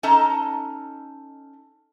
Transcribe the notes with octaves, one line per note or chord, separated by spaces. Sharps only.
C#4 D#4 A4 D#5 A5 A#5